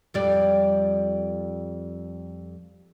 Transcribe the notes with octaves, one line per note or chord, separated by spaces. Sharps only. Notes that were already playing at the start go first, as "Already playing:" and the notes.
F2 G3 D5